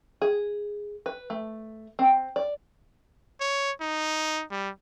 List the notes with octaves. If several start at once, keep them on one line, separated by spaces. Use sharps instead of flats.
G#4
B4
A3
C4
D5
C#5
D#4
G3